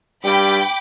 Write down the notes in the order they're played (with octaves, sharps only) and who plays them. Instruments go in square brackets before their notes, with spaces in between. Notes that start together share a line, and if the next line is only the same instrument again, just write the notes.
[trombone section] G2 G3 [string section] G5 B5 D6